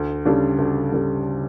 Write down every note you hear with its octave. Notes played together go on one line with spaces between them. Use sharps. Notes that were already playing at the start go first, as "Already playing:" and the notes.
Already playing: D2
C#3 G3 D4 A4
D2
C#3 G3 D4 A4